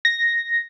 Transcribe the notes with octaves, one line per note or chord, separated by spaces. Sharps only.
A#6